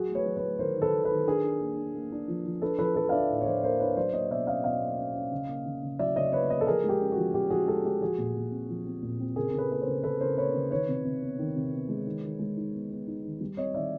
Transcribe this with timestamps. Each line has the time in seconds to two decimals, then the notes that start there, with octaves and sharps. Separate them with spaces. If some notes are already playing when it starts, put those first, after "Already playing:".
Already playing: F#3 F#4 G#4
0.09 A3
0.15 B4 C#5
0.26 F#3
0.37 B4 C#5
0.43 A3
0.59 D#3 A#4 C5
0.77 D#3
0.82 A4 B4
0.93 D#3
1.04 A4 B4
1.11 D#3
1.27 D4 G#4 A#4
1.43 D4
1.60 A#3
1.77 D4
1.94 A#3
2.12 D4
2.28 F3
2.45 F3
2.62 D4 A4 B4
2.78 F3 A4 B4
2.95 F3 A4 B4
3.09 F5
3.12 D4 D5 E5
3.30 A2
3.41 C#5
3.46 F3 C5 D5
3.63 A#3 A#4 C5
3.80 D4 B4 C#5
3.96 F#3 C5 D5
4.13 A#3 C#5 D#5
4.31 B2 D5 E5
4.47 C#4 D#5 F5
4.64 B2 D#5 F5
4.81 A#3
4.98 C#4
5.15 C#4
5.31 C#3
5.48 A#3
5.66 C#3
5.83 C#3
5.99 F#3 D5 E5
6.16 C#3 C#5 D#5
6.32 A#3 B4 C#5
6.49 A#3 C#5 D#5
6.61 A4
6.67 F3 G#4 A#4
6.84 G#3
6.89 G4
7.01 C#4
7.12 F#4
7.17 F3
7.34 C#4 G4
7.50 F3 F#4 G#4
7.67 G#3 G4 A4
7.84 G#3 G4
8.01 F3 F#4 G#4
8.18 A#2
8.36 A#2
8.52 C4
8.69 F3
8.86 C4
9.02 A#2
9.20 C4
9.36 C#3 G#4 A#4
9.49 A#4
9.54 C#3 A4 B4
9.70 A#3 B4
9.81 A#4 C5
9.87 C#3
10.03 C#3 A4 B4
10.21 C#3 A#4 C5
10.37 A#3 B4 C#5
10.54 C#3
10.71 D#3 B4 C#5
10.88 C3
11.05 C3
11.22 B3
11.39 D#3
11.56 C3
11.72 B3
11.89 G#3
12.07 D#3
12.23 D#3
12.39 G#3
12.57 D#4
12.73 B3
12.90 B3
13.07 D#4
13.24 D#3
13.41 G3
13.57 C4 C#5 D#5
13.74 D#3 D5 E5